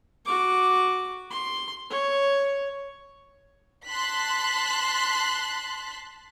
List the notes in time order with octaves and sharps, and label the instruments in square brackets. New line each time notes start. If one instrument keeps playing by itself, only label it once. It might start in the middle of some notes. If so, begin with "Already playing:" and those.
[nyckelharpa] F#4 D6
C6
C#5
[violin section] A5 C6 F#6 B6